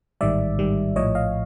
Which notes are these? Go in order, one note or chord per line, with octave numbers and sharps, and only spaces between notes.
A1 G#2 D#3 G3 D5 E5
A1 G#2 D#3 G3
A#1 A2 F3 C#5 D#5
D#5 F5